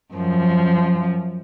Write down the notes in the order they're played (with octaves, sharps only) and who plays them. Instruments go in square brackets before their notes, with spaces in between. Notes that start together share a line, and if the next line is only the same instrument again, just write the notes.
[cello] F#2 F3